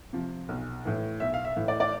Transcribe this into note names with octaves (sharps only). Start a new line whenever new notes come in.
C3 F3
B1
A2 E3
B1 E5
F5
E5
A2 E3
D5
D5